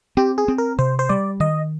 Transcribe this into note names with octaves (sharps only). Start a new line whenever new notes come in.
C4 G4
G#4
C4
A#4
C3 C5
C5
G3 D5
D#3 D#5